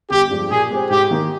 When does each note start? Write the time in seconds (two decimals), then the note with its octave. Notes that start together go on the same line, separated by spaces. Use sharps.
0.11 G1 G4
0.31 G2 F3 G#3
0.51 A#2 G#4
0.70 G#3 C4 G4
0.90 G#2 G4
1.11 D#3 A#3 D#4